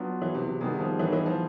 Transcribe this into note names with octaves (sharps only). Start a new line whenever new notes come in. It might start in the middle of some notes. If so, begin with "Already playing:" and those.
Already playing: F#3 B3 D4 F4
E3
C3
C3
C3 D#3 G3 B3 D#4 G#4
F3
E3
D#3
E3
F3